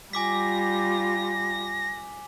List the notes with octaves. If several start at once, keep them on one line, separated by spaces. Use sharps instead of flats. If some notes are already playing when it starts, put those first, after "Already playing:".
G3 F4 G#5 D6 A#6 B6